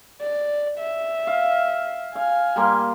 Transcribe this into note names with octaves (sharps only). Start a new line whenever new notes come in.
D5
E5
F5
F5 G#5
G3 A#3 C6